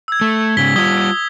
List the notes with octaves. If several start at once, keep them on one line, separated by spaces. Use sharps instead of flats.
E6 G#6
A3
G#2 C#3 B6 G7
G3 F4 D#6 G#6 G7